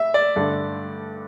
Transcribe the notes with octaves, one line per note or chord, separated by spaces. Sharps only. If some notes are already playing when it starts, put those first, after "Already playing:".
Already playing: E5
D5
G2 D3 A3